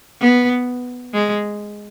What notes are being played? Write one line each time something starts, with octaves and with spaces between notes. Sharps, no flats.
B3
G#3